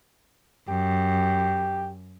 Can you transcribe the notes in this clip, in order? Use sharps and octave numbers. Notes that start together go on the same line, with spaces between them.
F#2 G4